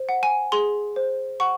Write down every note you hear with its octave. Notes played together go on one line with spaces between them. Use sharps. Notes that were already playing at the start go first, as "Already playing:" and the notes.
Already playing: C5
F#5
G#5
G#4 C6
C5
F#5 C#6